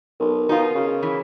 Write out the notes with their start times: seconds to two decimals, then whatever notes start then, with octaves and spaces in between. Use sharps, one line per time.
0.20 B1 A#4
0.49 B2 D#4 F4
0.75 C#3
1.03 E3